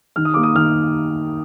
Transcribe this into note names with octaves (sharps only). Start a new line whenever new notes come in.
D#3 F6
D#6
A#3 D6
D#6
D#3 F6